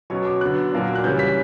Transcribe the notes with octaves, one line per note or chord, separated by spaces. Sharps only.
B2 F#3 C#4 C#6
D6
D3 F#3 B3 F#6
A#2 F#3 A#3 D4
F#6
C#3 E3 G3 C#4 G6
B6